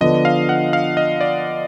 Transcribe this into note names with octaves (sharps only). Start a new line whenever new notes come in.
D3 F3 B3 D4 D#5
F5
F#5
F5
D#5
D5